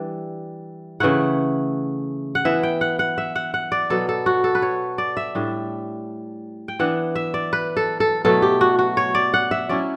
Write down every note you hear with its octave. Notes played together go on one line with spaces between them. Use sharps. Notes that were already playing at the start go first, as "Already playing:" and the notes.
Already playing: E3 G3 D4
C#3 E3 A3 E4 F#5
F#5
E3 B3 E4 E5
G5
F#5
F#5
E5
F#5
F#5
D5
B2 F#3 B3 A4
A4
F#4
A4
B4
C#5
D5
E5
A2 G3 D4
G5
E3 B3 D4 F#5
E5
D5
B4
A4
A4
B2 F#3 A3 E4 A4
G4
F#4
F#4
C#5
D5
F#5
E5
F#3 C#4 E4 D5